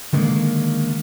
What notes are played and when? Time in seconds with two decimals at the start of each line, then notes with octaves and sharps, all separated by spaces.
0.12 D3 D#3 G#3 A#3